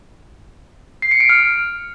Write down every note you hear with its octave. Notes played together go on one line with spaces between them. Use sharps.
C7
C#7
D7
F6